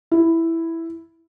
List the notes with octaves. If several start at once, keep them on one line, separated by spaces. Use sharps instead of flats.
E4